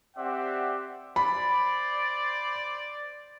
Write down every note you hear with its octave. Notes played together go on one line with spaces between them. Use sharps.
C4 G4 D5 E5 F#5
C5 D5 B5